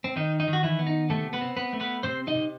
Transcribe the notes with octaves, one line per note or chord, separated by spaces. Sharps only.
C4
D#3 D#4
D#4
D#3
F#4
E3 E4
B3
D#4
C3 A3 A4
B3 B4
C4
B3 B4
A3
B3 B4
C3 C4 C5
D#4 D#5
C3